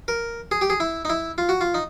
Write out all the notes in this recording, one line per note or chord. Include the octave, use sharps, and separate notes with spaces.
A#4
G#4
G4
G#4
E4
D#4
E4
F4
F#4
F4
D#4